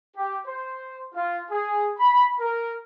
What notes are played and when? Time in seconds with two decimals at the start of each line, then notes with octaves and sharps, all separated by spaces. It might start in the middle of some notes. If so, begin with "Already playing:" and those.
0.16 G4
0.46 C5
1.15 F4
1.50 G#4
1.98 B5
2.39 A#4